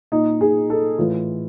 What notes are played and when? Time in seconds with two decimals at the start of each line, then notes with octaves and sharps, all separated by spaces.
0.12 A#2 D#4
0.41 G#4
0.70 A4
0.98 A2 E3 F4